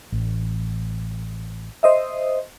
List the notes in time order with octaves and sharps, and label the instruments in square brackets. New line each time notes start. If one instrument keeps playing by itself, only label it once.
[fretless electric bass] A1
[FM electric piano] C5 D#5 E5